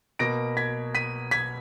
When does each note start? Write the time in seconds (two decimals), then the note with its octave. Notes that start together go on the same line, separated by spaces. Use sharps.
0.19 B2 A#3 A#6 D7
0.57 G#6 B6
0.95 B6 D#7
1.31 G#6 B6